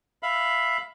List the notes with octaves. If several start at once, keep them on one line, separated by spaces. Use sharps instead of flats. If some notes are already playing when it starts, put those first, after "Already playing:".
E5 F5 B5